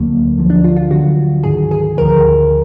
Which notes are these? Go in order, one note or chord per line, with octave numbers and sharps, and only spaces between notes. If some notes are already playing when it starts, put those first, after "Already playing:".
Already playing: D2 D3 F#3 A#3
D2 D3 F3
D4
F4
F4
D2 D3 F#3 F#4
G#2 D#3 F#3 G#4
G#4
D2 D3 F3 A#4